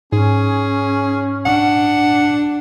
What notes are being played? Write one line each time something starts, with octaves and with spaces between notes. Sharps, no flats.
G#2 C#4 G#4
D4 F#5